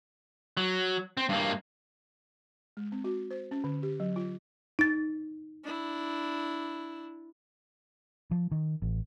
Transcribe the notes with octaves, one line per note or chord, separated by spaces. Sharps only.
F#3
C4
G2 A#3
G#3
C4
F#4
C5
C#4
D3
G4
F#3
F4
D#4 A6
D4 E4
F3
D#3
A1